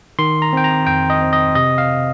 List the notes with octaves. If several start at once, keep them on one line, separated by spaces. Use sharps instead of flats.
D#3 C6
A#5
C4 G5
A#5
F2 G5
D#5
C4
D#5
C3 D#5
F5